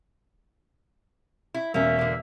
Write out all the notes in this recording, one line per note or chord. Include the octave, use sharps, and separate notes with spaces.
E4
E1 A#3 C#4 E5
D3 A#3